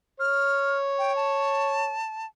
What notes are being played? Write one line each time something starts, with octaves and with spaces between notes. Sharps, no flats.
C#5 F6
G5
A5